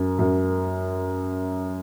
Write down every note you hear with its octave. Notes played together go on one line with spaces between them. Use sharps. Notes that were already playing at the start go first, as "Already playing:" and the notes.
Already playing: F#2
F#2